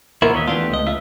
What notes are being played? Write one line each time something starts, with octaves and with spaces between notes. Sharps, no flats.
A#2 B3 E4 A#4 C5 C#5
D#2 C#5 D#5 E5
E3 A3 B3 D4 F4 G4
C#2 D#5
F4 E5